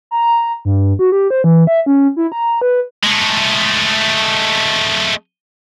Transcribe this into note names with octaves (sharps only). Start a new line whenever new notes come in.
A#5
G2
F#4
G4
C5
E3
E5
C#4
E4
A#5
B4
G#3 A3